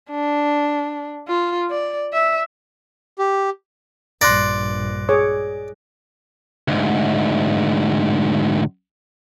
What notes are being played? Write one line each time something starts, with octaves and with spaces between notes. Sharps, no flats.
D4
F4
D5
E5
G4
A#1 G2 D5 C6 F#6 A#6
G#4 C#5 D6
D2 G#2